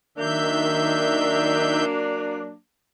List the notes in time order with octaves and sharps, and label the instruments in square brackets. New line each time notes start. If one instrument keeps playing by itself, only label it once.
[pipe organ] D#3 E5 G6 [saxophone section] F#3 A#3 D4